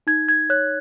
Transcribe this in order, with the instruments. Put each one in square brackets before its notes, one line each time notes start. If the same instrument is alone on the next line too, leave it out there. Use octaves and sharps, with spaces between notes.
[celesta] D#4 G#6
G#6
C#5 F#6